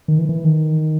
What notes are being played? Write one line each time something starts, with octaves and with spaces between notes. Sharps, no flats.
D#3
E3
E3
D#3